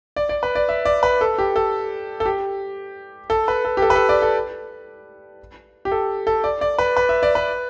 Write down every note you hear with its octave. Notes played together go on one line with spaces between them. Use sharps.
D5
D5
B4
D5
E5
D5
B4
A4
G4
A4
A4
G4
A4
B4
A4
G4
A4
B4
A4
D5
A4
G4
A4
A4
D5
D5
B4
B4
E5
D5
B4